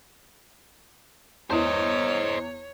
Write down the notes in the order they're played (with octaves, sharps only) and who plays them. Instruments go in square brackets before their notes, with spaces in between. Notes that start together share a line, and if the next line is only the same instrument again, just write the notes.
[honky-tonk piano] E2 E3 [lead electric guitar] C5 D#5 [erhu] C#5